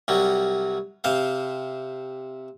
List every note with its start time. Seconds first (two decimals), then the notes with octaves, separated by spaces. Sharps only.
0.08 C2 F#3 G3
1.04 C3 C5 F5